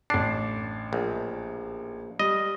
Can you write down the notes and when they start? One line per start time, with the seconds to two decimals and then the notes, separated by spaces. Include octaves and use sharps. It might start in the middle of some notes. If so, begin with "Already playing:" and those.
0.10 A1 D4 C7
0.93 A#1
2.20 G3 D#5